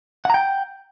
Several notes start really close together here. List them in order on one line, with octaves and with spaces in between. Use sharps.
F#5 A#5 G5